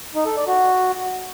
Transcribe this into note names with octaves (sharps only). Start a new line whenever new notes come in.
D#4
A4
D5
F#4